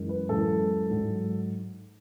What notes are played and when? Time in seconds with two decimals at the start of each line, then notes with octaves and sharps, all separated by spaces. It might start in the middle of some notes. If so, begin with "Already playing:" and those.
Already playing: F#2 E3 G#3
0.09 B4
0.29 F#2 E3 G#3 A4
0.90 G#2 F#3